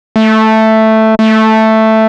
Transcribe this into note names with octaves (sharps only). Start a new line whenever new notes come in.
A3
A3